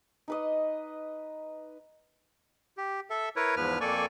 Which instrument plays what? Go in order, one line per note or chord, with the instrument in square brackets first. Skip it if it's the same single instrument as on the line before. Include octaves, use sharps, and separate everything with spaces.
[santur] D#4 B4 D#5
[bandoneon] G4
A4 E5
E4 A#4 B4 C#5
E2 G#2 F3 B4 F6
F2 A#3 A4 D5 G#5 C#6